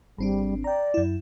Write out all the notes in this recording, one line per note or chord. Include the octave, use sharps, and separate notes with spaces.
G#1 G3 C4 D4
D5 G5 A#5
F#2 E4